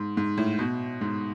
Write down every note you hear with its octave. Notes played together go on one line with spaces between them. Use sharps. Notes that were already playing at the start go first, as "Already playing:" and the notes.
Already playing: G#2
G#2
A2
B2
G#2